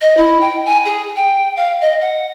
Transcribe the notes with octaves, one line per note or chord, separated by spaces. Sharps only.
D#5
E4
G5
G#5
G#4
G5
F5
D#5
F#5